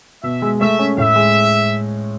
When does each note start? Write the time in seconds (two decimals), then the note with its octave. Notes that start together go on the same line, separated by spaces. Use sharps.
0.23 B2 E5
0.42 G#3
0.60 A3 E5
0.79 C#4
0.98 A2 E5
1.16 G#3